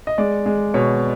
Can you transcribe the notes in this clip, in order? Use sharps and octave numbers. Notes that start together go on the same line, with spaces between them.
D#5
G#3 D5
G#3
B2 C#5